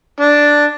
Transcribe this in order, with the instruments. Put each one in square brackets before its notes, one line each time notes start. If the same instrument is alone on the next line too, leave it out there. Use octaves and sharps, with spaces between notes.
[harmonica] D4